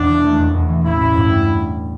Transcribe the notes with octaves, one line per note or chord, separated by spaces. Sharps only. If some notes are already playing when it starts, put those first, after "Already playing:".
Already playing: E1 E2 D4
E3
A3
E1
E2
E3
A1 E4
A1
G2
G3